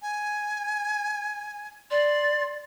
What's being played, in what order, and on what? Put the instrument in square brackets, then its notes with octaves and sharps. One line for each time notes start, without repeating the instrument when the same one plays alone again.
[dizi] G#5
[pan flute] D5 [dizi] C6